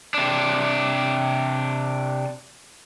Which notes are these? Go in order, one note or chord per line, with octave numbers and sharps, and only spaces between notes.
C3 D4